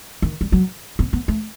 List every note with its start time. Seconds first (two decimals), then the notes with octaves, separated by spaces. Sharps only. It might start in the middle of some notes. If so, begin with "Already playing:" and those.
0.22 D#3
0.41 G3
0.52 F#3
0.99 B3
1.13 B3
1.28 A3